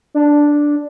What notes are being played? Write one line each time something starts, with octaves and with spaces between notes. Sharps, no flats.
D4